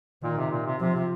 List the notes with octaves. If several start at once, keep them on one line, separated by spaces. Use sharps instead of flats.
A#2 D#3
C3
A#2
C3
C3 F3
C3